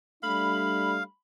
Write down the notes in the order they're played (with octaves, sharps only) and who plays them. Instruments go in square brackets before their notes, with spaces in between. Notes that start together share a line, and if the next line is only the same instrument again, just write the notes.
[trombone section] G3 A3 D4 [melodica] F5 [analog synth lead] B5